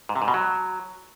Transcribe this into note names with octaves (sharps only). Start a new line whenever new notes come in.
G#2
C3
G#2
B2
F#3